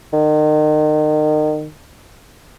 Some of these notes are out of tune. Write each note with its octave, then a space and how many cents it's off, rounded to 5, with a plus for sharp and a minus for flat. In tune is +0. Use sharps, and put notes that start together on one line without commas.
D#3 -30